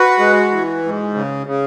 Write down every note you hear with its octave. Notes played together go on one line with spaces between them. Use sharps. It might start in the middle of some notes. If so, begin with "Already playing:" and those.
Already playing: F#4 B4
G#3
E3
G#2
C#3
C#3